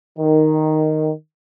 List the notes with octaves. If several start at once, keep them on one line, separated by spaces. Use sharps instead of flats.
D#3